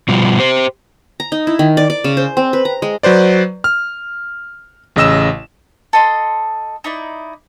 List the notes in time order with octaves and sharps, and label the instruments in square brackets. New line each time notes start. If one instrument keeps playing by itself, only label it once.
[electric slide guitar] B2 F3 G3
G4 C5
[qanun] A#5
D#4
E4
D#3
D5
D5
C#3
C5
C4
B4
A#5
G#3
[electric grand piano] F#3 B4 C5 D5
F6
A1 C#3 D#5 E6 E7
[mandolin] A4 D#5 C6
D#4 E4 D5